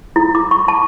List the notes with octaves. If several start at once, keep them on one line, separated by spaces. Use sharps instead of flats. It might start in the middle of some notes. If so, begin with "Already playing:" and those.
E4
D6
C#6
A5